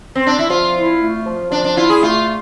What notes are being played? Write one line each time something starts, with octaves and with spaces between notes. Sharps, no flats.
C4
D4
E4
F3 F4
E4
A3
F3
F3 D4
D4
E4 F4
G#4
A3 F4